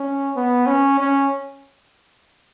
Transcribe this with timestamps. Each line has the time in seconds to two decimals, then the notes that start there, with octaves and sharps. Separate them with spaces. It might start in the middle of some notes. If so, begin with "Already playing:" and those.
Already playing: C#4
0.36 B3
0.67 C#4
0.99 C#4